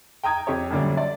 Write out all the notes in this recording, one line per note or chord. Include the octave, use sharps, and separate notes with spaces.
G5 A#5 D#6 G#6
F2 G4 C#5
F#2 A#2 D3 G3 C#4 D4
D5